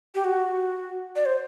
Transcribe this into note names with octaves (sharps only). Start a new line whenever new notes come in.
G4
F#4
D5
C5